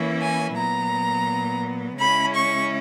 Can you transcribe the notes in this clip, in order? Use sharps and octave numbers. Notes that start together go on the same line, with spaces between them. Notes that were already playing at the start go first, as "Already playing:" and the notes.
Already playing: E3 A#3 C#4 E4
G#5
A#2 F#3 B3 A#5
C#3 G#3 C#4 E4 B5
C#6